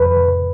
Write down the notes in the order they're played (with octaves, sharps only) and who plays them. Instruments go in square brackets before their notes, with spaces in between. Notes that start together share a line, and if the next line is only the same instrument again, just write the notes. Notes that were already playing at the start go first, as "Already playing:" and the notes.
Already playing: [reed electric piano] F2 B4